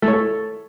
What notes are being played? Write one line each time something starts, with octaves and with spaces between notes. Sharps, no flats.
A3
C#5
A4